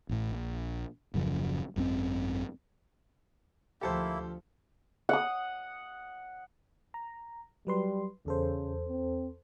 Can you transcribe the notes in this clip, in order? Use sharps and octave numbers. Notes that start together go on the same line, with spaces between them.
A1 A2
A#1
D#1 F#2 C#3 F3
G#1 F#2 E3 C4
D2 F3 A#3 E4 G4 A4 C5
F#5 D#6
A#5
F#3 G3 B4 C6
E2 C#3 A4 C5
C4